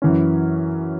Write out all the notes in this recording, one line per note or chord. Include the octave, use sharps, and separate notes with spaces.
F#2 E3 C#4